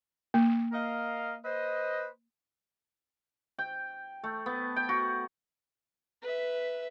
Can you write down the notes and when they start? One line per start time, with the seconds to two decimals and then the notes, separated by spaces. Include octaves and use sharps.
0.34 A#3
0.72 A#4 D#5 F5
1.45 B4 C5 D#5
3.59 G5
4.23 A3
4.46 B3
4.76 G5
4.89 F#4
6.22 B4 E5